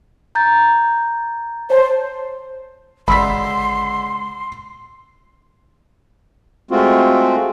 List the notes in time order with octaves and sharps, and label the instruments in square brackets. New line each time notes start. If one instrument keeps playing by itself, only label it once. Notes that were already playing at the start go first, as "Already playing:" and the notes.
[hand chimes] A#5 G6 A6
[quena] C5 [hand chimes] C#5 A5
[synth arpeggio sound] G#1 [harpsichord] C#2 D3 [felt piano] B5 E6 B6 [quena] C6
[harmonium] G#3 A3 C4 F4 F#4